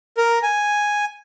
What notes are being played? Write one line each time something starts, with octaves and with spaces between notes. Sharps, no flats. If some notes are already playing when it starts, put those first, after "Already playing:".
A#4
G#5